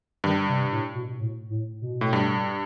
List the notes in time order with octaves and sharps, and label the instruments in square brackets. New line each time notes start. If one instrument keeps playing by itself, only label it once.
[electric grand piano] G2 [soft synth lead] D#3
[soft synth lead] C3
A2
B2
A2
A2
B2
[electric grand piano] A2
G2